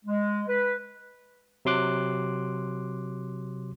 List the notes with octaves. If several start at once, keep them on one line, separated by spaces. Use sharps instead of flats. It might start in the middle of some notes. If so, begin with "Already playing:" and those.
G#3
B4
C3 F#3 C6 D6 F#6